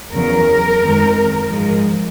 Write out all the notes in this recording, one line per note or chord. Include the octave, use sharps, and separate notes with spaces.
E2 C#3 F#3 A#4
F#2 D#3 G#3 C4
G#2 F3 G#3